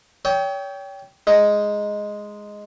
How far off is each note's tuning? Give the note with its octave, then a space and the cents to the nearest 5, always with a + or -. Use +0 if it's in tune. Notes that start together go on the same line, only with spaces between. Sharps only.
C#5 +35 G5 +0 D#6 +45
G#3 +0 D#4 +0